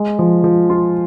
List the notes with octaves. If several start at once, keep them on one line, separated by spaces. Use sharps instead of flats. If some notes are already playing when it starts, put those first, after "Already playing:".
Already playing: G#3
F3
F3
F4